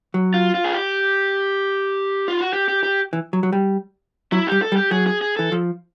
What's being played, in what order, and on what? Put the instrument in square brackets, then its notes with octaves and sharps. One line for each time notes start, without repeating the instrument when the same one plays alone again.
[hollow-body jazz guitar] F#3
[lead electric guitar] F4
F4
G#4
G4
F4
F#4
G4
G4
G4
[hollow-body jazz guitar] E3
F#3
F#3
G3
[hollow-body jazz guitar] F#3 [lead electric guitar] E4
[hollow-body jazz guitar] G3 [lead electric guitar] G4
[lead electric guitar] A4
[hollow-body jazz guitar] G3
[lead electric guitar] G4
[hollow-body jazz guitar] F#3 [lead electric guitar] G#4
[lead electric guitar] G#4
G#4
[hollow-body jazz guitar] E3 [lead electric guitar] A4
[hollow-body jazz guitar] F3